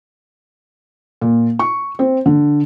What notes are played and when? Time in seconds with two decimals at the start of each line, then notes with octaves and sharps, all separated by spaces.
1.21 A#2
1.59 C#6
1.99 C4
2.26 D3